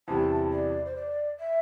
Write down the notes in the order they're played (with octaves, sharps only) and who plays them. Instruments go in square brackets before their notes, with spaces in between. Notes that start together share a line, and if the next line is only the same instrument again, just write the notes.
[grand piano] E2 C3 G3 E4 [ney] A5
[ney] D5
C5
D5
E5